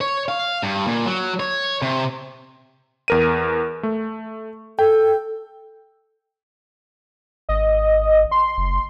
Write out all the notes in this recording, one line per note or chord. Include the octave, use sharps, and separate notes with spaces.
C#5
F5
G2
A#2
F#3
C#5
C3
E2 A#4 D#7
A3
A4 G5
G#1 D#5
C6
F#1